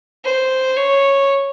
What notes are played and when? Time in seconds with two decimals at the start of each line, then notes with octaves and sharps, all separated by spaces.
0.24 C5
0.76 C#5